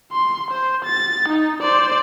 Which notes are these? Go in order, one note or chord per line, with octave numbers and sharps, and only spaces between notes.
C6
C5
A6
D#4
C5 D5